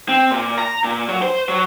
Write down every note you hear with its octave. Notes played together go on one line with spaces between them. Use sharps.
C4
A#2
A#5
A#2
F#3
C5
F#3